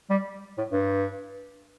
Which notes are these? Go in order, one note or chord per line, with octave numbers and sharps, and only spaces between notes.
G3
A2
G2